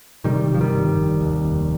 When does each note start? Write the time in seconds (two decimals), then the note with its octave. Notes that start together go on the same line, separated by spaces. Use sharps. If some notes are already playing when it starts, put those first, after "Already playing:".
0.24 C3 D#3 G3
0.49 G1
0.55 F3
0.61 D#3 G3
0.73 G1
0.96 F1
1.21 D#2
1.45 F1